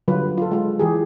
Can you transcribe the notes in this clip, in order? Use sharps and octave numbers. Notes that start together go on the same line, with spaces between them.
D3 F#3 G3 F4 B4
F4 A4
G#3 F4
E3 G4 G#4